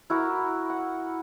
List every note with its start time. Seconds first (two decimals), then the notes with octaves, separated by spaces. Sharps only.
0.10 E4 F#4 A#4
0.69 F#5